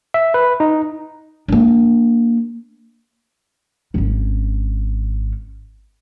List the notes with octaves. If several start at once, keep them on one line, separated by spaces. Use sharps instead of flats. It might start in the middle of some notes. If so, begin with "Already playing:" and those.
E5
B4
D#4
A#3 D4
G#1 C#4